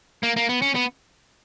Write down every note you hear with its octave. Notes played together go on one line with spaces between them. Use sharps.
A#3
A#3
B3
C#4
B3